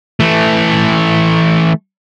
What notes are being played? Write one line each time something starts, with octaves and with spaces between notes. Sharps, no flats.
E3 A3